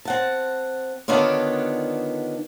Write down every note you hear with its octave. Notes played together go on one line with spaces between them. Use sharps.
C4 F#5 A5
D3 D#3 B3 D4 F4 C#5